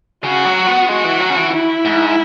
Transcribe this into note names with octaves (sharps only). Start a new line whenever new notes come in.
C#3 F#4
F#3
B3
G#3 F#4
E3
F#3
C#3
E3
E4
G#2